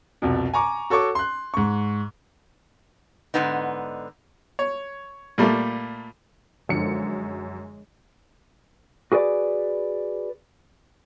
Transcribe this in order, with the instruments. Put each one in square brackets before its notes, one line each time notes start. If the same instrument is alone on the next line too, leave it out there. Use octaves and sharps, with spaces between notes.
[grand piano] C2 F2 B2
G#5 A#5 C#6 D6
F#4 A4 C#5 C#6 D6
C6 F#6
G#2 C#6
[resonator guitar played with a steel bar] G#2 D3 B3 D#4
[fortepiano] C#5
A#2 G3 A3 A#3
[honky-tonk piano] F#2 C#7 [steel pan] D3 F3 [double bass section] G#3
[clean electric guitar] F#4 G#4 B4 D5